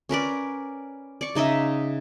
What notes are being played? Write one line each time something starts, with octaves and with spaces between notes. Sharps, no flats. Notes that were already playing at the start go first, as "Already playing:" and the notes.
C#4 A#4 B4 D5
D5 C#6
C#3 D#4 D#5 E5